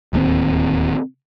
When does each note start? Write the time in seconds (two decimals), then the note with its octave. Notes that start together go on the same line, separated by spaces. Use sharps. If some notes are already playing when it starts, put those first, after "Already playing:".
0.13 D1 D#2 F3 C4